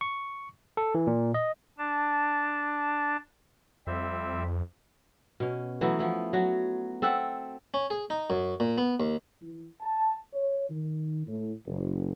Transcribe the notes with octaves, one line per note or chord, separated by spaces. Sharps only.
C#6
A4
E3
A#2
D#5
D4 A5
F2 G3 C4 E5
B2 C#4
E3 F#3 A3 B3
F3 B3 E4
F#3 F#4
C4 A4 E5 F#5
C#4
G#4
D#4
F#2
A#2
B3
D#2
E3
A5
C#5
D#3
A2
F#1